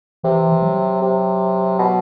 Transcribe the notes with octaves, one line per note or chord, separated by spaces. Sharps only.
C3 E3
E3
F#3
C3
B2